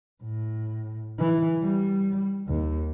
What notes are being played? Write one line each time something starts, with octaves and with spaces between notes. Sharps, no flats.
A2
E3
G3
D#2